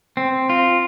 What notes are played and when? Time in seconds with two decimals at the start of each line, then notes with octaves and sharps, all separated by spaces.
0.17 C4
0.50 F4